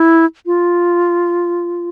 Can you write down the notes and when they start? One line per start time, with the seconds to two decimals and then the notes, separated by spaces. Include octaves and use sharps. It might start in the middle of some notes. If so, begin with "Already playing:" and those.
Already playing: E4
0.46 F4